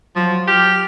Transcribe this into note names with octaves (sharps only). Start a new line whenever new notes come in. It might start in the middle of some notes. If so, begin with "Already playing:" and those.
F3 F#3
G4 F6